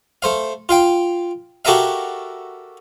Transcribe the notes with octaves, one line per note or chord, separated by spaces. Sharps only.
A3 C5 F5
F4 F5 G5
F#4 G4 A4 A#4 E5 F5